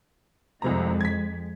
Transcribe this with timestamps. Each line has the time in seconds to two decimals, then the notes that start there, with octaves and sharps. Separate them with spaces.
0.62 C2 F2 C3 G#3 A#5
1.01 G#6 B6